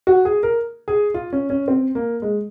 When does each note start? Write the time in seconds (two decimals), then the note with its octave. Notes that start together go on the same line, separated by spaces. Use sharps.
0.07 F#4
0.25 G#4
0.43 A#4
0.88 G#4
1.14 F4
1.33 C#4
1.50 C#4
1.68 C4
1.95 A#3
2.22 G#3